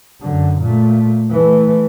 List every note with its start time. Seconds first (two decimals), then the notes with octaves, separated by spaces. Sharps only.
0.22 F#2 D3
0.61 A#2 A3
1.31 E3 A3